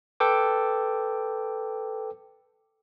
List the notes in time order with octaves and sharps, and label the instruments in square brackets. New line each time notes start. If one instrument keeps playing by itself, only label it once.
[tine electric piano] A4 B4 G5 D6